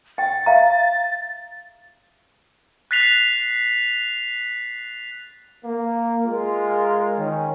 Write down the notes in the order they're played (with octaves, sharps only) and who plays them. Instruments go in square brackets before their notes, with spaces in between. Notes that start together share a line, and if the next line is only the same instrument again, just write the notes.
[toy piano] G5 [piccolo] A6
[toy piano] E5 F5 A#5
[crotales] F#6 A6 B6 C7 F7
[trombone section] A#3
G#3 F4 A#4
D#3 C#4